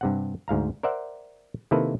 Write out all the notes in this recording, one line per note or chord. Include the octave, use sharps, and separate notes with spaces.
G2 C3 F#5
D2 G#2 F5 A#5
A#4 C5 D5 E5 F#5
C3 D#3 A#3 E4 A4 B4